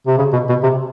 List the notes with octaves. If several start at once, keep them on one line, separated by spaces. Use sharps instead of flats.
C3
C#3
B2
B2
C3